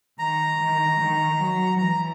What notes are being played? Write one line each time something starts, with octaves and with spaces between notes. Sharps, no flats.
D#3 A#5
D#3
D#3
F#3
E3 A#5